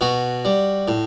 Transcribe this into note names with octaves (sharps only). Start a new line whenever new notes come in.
B2 F#4
G3
A2